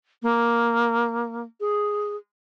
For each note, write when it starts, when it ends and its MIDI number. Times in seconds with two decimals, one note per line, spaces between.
0.22 1.43 58
1.60 2.16 68